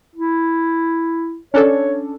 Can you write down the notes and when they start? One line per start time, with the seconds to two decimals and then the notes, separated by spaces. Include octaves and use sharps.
0.16 E4
1.54 C#4 D4 A4 C#5